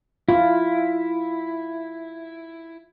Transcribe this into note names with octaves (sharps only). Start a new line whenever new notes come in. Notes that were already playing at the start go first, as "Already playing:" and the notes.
E4 F4